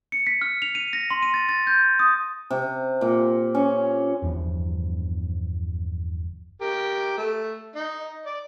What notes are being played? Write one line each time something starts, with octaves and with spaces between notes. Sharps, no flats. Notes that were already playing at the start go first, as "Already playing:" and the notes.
C#7
B6
F6
F7
D#7
A#6
C6
D#7
A6
A6
G6
D#6
C3
A#2
C#4
G1 E2 G2 F3
G4 A#4
A3
D#4
D5